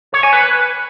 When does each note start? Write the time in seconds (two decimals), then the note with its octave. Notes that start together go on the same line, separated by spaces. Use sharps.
0.14 C#5
0.23 G#5
0.33 B4